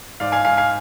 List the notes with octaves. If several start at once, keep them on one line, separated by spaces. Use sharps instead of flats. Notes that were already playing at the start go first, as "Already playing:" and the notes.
G#2 D5 F5
F5 G#5
G#2 F5 G#5
F5 G#5